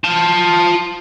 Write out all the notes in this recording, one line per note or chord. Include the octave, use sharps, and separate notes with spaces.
F4 A5